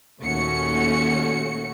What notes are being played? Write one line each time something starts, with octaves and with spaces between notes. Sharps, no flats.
D#2 A#2 A3 C#4 F#4 C#7